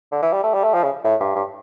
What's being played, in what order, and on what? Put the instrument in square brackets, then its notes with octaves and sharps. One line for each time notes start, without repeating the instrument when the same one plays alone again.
[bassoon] D3
E3
G3
A3
G3
A3
F3
C#3
A2
G2
G2